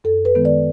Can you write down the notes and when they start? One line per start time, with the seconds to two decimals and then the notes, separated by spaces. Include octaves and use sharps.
0.04 F#2 A4
0.25 B4
0.35 D#3 G#3 B3
0.45 D5